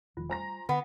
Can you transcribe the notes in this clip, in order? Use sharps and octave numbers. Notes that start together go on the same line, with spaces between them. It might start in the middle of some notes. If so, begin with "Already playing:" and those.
E1 D#3 F3 F4
G3 C5 G#5 A#5 A#6
D3 B3 F#5